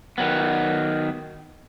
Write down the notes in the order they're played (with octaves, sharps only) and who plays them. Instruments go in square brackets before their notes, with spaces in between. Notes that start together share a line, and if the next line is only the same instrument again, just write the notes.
[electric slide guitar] D#3 F#3 B3